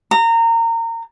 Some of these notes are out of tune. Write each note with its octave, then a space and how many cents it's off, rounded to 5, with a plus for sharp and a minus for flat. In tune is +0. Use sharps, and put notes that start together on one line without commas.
A#5 -25